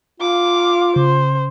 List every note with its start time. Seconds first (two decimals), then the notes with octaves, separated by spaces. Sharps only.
0.20 F4 F5 D6
0.96 C#3 C5